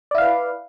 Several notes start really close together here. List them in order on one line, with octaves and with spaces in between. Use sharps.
D5 E4 F5 B4